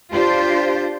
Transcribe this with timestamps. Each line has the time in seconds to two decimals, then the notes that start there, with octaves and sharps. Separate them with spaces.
0.11 D4 F4 G4 C5